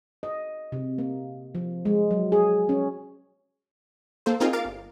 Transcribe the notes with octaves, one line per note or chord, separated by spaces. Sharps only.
D#5
C3
A#3
F3
G#3
F#3
G#4
C#4
A#3 A4 C5
A#3 C4 D#4 F4 G#4 A#4
A#4 F5 D6 A6 D7
G1